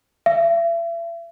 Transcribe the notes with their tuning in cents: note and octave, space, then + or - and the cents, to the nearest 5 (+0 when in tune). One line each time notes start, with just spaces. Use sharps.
E5 +40